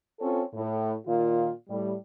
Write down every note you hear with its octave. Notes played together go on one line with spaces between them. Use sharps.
C4 C#4 F4 A4 C#5
A2
A#2 D#3 F4
A2 G3